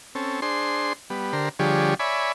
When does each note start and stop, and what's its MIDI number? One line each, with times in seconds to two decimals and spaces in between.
0.15 0.40 60
0.15 0.40 61
0.15 0.40 69
0.42 0.93 62
0.42 0.93 68
0.42 0.93 72
0.42 0.93 84
1.10 1.33 55
1.10 1.33 59
1.33 1.49 50
1.33 1.49 67
1.33 1.49 70
1.33 1.49 72
1.59 1.94 50
1.59 1.94 53
1.59 1.94 55
1.59 1.94 67
1.59 1.94 68
1.59 1.94 73
1.99 2.32 73
1.99 2.32 74
1.99 2.32 76
1.99 2.32 80
1.99 2.32 83